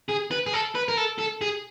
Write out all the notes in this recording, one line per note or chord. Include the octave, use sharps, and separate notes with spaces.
G#4
B4
G#4
A4
B4
A#4
A4
A4
G#4